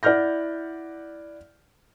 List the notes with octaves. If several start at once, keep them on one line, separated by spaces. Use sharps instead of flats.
E4 D5 F#5 F6 G6 A#6